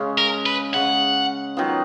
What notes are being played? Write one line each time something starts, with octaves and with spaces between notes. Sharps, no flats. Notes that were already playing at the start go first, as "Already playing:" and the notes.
Already playing: C#3 G#3 C#4
A#4
B4
C#3 G#3 C#4 F#5
D#3 F#3 B3 F4